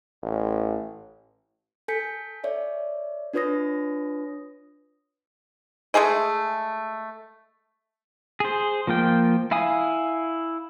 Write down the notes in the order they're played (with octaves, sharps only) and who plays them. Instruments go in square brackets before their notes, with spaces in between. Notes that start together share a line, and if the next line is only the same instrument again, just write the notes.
[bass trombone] A1
[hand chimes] A4 G#5 G6 B6 C#7
C#5 D5 E5
D4 F4 B4 C#5 D#6 A#6
[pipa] G#3 A3 G#4 D#5
[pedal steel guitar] G#4 C5
F3 A#3 F4 G5
E4 F5 G#5 D#6